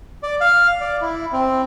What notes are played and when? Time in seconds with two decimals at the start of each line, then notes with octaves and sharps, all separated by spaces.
0.23 D5
0.41 F5
0.81 D5
1.01 E4
1.32 C4